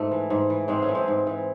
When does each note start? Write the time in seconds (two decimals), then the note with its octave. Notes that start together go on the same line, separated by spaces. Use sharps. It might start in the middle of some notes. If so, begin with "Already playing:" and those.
Already playing: G#2 A3
0.12 E3
0.30 G#2
0.50 E3
0.68 G#2 G#3 C4
0.82 A3 C#4
0.89 E3
0.95 G#3 C4
1.08 G#2
1.27 E3